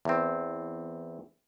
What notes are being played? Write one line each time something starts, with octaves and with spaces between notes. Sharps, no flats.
E2 C4